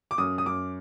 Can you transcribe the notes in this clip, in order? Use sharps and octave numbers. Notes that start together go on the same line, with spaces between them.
D6
F#2 D#6
D#6
F#2 D6